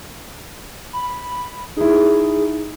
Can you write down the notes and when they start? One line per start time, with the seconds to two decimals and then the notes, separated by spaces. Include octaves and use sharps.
0.93 B5
1.77 D#4 E4 G#4